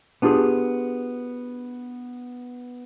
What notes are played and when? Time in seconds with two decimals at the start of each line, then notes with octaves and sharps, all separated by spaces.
0.22 B3 D4 F4 G4 G#4